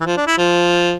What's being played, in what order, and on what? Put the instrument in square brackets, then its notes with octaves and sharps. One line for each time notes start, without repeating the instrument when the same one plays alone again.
[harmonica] E3
F3
D4
E4
F3